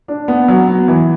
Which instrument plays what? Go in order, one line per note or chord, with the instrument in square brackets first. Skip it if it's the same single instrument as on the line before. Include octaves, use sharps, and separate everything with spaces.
[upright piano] D4
B3
F#3
B3
E3